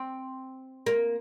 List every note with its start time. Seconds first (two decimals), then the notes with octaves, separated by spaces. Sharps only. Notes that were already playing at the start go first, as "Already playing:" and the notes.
Already playing: C4
0.86 A#3